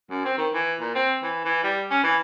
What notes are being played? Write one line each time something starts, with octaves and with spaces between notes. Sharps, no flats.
F#2
C4
D#3
E3
A#2
C4
E3
E3
G3
C#4
E3